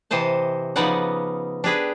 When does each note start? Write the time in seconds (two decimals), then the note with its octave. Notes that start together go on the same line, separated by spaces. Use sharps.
0.11 C3 E3 C5 D#5 A5
0.76 C#3 F3 B3 D#4 D5 F#5
1.64 D4 G4 G#4 B4